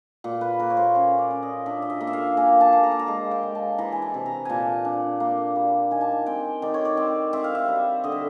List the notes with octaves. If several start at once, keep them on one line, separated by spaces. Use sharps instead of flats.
A#2
B4
A#3 A#4
C#5
C5
C#4 C#5
D5
C#4
D#5
D4 E5
D#5
E5
A#3
E5
F5
A#3 G#5
A5
A#3
A#5
A5
A#5
G#3 A5
G5
G#3
A5
E3 A#5
G#5
A5
C3
A#5
A#2 G#5 A5
D4
A#3
G3
D#3 G#5
A5
G#5
C4 G5
D#3 D5
C#5
D5
C4
C4 E5
F5
E5
G3
D3 D#5
E5